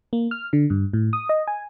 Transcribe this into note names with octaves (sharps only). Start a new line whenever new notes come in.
A#3
F6
D3
G2
A2
D#6
D#5
G#5